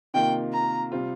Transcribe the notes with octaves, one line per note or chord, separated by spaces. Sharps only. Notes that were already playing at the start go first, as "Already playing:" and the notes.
C3 D#3 A#3 F4 G5
A#5
C3 G3 C4 F4